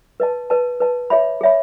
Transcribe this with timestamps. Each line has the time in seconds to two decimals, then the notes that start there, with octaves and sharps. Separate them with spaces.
0.20 B4 D#5 A5
0.50 B4 D#5 A5
0.80 B4 D#5 A5
1.10 G#4 C#5 E5 B5
1.41 G#4 C#5 E5 B5